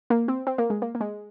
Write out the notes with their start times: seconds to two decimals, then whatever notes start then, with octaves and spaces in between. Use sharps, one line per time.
0.10 A#3
0.28 C4
0.47 C4
0.58 A#3
0.70 G#3
0.82 A#3
0.95 A#3
1.01 G#3